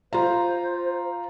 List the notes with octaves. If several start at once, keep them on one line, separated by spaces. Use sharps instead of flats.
F4 C5 A#5